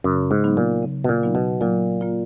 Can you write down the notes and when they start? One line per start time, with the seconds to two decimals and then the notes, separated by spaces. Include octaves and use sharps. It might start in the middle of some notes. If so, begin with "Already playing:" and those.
0.04 F#2 C#3
0.31 G#2
0.44 F#3 B3 D#4
0.57 A#2
0.83 C#3
1.04 B2
1.09 A#2
1.23 F#3 B3 D#4
1.35 B2
1.61 A#2 F#3
2.01 A#3 F4